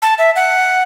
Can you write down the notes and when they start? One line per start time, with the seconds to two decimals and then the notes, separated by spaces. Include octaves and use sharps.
0.02 A5
0.18 E5
0.36 F#5